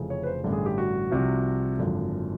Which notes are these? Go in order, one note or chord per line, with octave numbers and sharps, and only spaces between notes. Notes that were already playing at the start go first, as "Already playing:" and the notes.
Already playing: F1 F2 C#3 E3
C#5
B4
C5
A1 G2 D3
G#4
G4
F#4
C2 C3 F3
G#1 F#2 D3 F3